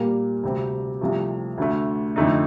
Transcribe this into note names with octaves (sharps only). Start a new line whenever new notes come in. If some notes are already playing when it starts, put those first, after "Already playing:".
Already playing: A#2 G3 A#3
D2 C3 G3 C4 G4
C2 C3 F3 A3
D2 D3 A3
F2 D3 A3 D#4